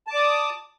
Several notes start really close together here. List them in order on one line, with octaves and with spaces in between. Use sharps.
A5 D6 D5 D#6